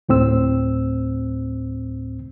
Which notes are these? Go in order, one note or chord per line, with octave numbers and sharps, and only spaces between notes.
D2 A2 C4 E6